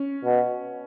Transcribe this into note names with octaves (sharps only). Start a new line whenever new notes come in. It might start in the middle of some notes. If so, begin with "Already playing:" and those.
Already playing: C#4
B2